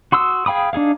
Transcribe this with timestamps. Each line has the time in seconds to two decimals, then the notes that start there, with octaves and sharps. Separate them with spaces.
0.12 F#4 C6 D#6 E6
0.46 G#4 F5 G5 B5 D#6
0.73 D4 D#4 G#4 F5